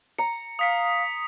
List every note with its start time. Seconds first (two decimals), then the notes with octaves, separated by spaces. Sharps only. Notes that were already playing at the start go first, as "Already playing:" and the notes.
0.18 A#5 C#7
0.59 F5 D#6 B6 C#7